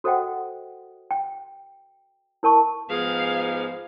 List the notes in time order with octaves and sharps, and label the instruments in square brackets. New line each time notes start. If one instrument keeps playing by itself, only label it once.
[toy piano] F#4 A4 C5 D#5 F#5 G5
G5
E4 A#4 A5 C#6
[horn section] G#2 F3 B3 [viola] G#4 F5